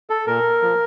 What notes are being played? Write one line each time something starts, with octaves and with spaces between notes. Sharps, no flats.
A4
A#2 A#4
F3